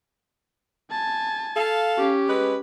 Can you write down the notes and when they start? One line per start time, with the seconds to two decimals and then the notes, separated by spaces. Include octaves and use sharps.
0.91 G#5 A5
1.56 A4 F5
1.98 C#4 G4
2.29 G#3 B4